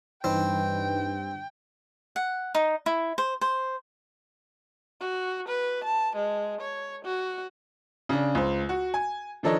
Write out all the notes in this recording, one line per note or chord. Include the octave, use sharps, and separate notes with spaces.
G2 E3 C4 D#4 B4 G5
F#5
D#4
E4
C5
C5
F#4
B4
A5
G#3
C#5
F#4
C#3 D4
C#2 C5
F#4
G#5
D#3 F3 D4 A4 C#5 D#5